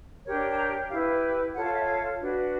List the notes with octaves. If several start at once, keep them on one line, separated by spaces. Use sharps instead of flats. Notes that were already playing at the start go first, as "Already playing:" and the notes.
D4 G4 A#4 C#5
A5
A#5
E4 G4 B4 F5
F4 A4 C#5 F#5
F5
E5
F5
D4 F#4 B4